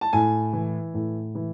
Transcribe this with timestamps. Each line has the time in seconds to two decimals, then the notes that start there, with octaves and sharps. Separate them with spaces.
0.01 A5
0.13 A2 G#5
0.53 E3
0.94 A2
1.35 E3